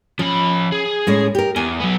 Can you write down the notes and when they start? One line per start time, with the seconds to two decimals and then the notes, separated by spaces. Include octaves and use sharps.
0.19 F3 C#4 B5
0.72 G#4
1.07 A2 G#3 C#4
1.35 G4 A#4
1.56 E2 G#5
1.80 F#3 B3